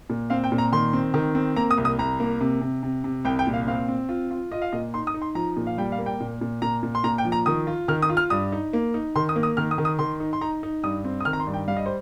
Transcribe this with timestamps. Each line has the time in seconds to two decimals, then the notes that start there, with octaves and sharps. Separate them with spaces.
0.10 A#2
0.30 C4 F5
0.44 G5
0.52 A#2
0.58 A#5
0.72 D#3 C6
0.93 C4
1.14 D#3
1.35 C4
1.56 A#3 A#5
1.71 D#6
1.78 C2
1.85 D#6
1.99 C2 A#5
2.20 A#3
2.41 C3
2.61 C3
2.83 C3
3.04 C3
3.25 C2 G5
3.39 G5
3.47 A#2
3.53 F5
3.67 C4 F5
3.88 C4
4.09 F4
4.31 F4
4.51 F4 D#5
4.62 F5
4.72 A#2 D#5
4.94 D#4 C6
5.07 D#6
5.14 D#4
5.22 C6
5.35 F3 A#5
5.56 A#2
5.67 F5
5.78 G3 G5
5.92 F5
5.99 A#3
6.06 G5
6.20 A#2
6.41 A#2
6.62 A#2 A#5
6.83 A#2
6.95 C6
7.04 A#2 A#5
7.18 G5
7.25 F3
7.32 A#5
7.46 D#3 D#6
7.67 F4
7.88 D#3 F6
8.02 D#6
8.09 F4
8.17 F6
8.30 G2 D#6
8.52 D#4
8.73 A#3
8.94 D#4
9.16 D#3 C6
9.29 D#6
9.36 A#3
9.43 D#6
9.57 D#3 F6
9.71 D#6
9.78 D#3
9.85 D#6
9.99 D#3 C6
10.20 D#4
10.33 C6
10.41 D#4 A#5
10.63 D#4
10.83 G2 D#6
11.05 C4
11.20 D#6
11.25 D#3 F6
11.33 A#5
11.40 C6
11.47 G2
11.54 G5
11.68 G3 F5
11.77 D#5
11.86 C5